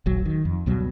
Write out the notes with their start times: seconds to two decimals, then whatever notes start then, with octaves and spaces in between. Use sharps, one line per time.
0.06 E1 A#1 F#3
0.25 D#3
0.45 F2
0.66 C#2 B2 F#3 G3